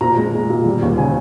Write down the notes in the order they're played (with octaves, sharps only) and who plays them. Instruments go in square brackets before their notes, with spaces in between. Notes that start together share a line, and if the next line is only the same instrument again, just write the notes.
[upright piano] A#2 A#5
G#3
G#3
A#2
G3
D#2
C#3 G#5